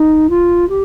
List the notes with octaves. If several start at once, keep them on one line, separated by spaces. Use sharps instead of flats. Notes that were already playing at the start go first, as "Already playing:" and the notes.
Already playing: D#4
F4
G4